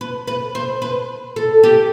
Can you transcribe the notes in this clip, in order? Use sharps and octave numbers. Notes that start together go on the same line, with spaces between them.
B4
B4
C5
B4
A4
G4